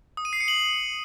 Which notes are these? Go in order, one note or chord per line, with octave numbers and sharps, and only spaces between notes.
D#6
D#7
C7
C#7
F#7